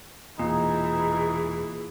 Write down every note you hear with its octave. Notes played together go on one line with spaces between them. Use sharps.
E1 A#2 E3 D#4 G#4